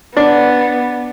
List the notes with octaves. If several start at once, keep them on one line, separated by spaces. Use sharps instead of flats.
B3 D4